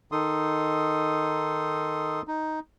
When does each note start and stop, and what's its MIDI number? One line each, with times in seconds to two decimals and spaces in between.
0.12 2.22 51
0.12 2.22 63
0.12 2.22 69
0.12 2.22 84
0.12 2.22 87
2.28 2.60 63